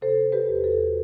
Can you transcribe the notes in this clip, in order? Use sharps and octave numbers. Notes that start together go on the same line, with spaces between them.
C3 A4 C5
G4 B4
E2
F#4 A4